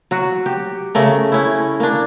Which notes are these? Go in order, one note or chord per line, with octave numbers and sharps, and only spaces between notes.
F#3 F#4
G4
C#3 A3 A#4
C#4 E4
A#3 D4